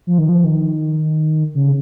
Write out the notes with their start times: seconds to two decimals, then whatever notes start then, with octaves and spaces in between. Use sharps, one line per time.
0.07 F3
0.18 D#3
0.29 F3
0.44 D#3
1.55 C#3